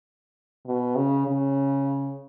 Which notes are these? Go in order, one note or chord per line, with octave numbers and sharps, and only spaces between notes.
B2
C#3
C#3